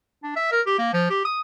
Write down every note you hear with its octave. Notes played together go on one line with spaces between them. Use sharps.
D4
E5
A#4
G4
A#3
F3
G4
D#6